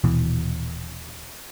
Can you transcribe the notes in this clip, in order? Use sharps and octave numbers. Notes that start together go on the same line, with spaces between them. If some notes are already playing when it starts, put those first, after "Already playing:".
D#1 B2 E3